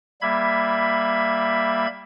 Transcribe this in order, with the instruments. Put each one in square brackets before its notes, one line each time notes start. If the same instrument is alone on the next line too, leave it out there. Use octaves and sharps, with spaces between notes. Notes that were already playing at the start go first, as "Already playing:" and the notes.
[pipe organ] G3 A#3 E5 B5 G#6